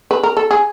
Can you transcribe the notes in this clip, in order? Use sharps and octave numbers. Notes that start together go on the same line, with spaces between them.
B4
A#4
A4
G#4